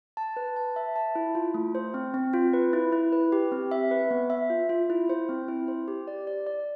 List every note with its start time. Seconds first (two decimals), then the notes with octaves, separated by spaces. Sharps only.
0.17 A5
0.37 B4
0.56 A5
0.76 E5
0.96 A5
1.15 E4
1.35 F4
1.54 A3
1.75 C5
1.94 C4
2.14 C4
2.33 F4
2.53 B4
2.73 E4
2.92 E4
3.12 B4
3.32 G4
3.52 C4
3.71 E5
3.91 B4
4.11 B3
4.30 E5
4.50 F4
4.69 F4
4.90 E4
5.10 C5
5.29 C4
5.48 E4
5.68 C5
5.88 G4
6.07 D5
6.27 D5
6.47 D5